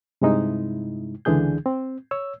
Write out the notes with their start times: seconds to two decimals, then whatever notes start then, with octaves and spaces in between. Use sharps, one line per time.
0.21 G2 C3 G#3 D#4 E4
1.25 C#2 D3 E3 D4 G#4 G6
1.66 C4
2.11 C#5 E6